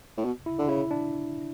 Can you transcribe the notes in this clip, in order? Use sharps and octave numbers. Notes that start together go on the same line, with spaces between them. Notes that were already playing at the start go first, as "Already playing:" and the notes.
A2
B2
E4
D3
C#3 E4
D4